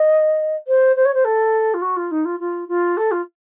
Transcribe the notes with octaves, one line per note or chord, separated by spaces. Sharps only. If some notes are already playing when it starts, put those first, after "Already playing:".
Already playing: D#5
C5
C5
C#5
C5
A4
F4
F#4
F4
D#4
F4
F4
F4
A4
F4